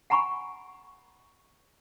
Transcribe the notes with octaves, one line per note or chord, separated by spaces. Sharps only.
F#5 G#5 A#5 B5 C#6